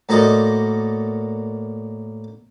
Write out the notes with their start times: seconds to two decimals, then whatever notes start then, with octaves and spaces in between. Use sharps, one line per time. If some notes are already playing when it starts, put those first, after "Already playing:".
0.09 A2 A#3 F#4 C5 D5 D#5